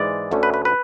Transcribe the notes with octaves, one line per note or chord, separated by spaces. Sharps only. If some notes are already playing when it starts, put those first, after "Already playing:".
Already playing: G#2 E3 G#3 D5
D2 D3 A3 C#4
B4
B4
B4